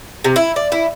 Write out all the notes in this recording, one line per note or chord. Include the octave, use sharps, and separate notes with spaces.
C3
E4
D5
E4